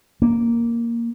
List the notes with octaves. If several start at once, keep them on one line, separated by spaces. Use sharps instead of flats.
A#3